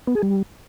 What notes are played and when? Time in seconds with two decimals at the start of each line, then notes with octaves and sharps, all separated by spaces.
0.07 B3
0.15 G#4
0.23 G3